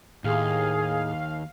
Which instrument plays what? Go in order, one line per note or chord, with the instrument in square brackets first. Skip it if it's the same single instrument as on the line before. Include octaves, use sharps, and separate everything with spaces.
[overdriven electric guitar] D#2 [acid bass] A2 [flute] G#4 [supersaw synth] F5